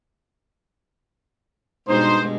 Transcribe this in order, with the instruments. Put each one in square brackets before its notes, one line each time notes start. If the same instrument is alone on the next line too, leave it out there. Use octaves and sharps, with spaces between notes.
[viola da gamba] G2 B2 G#3 [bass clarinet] D#4 [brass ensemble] C5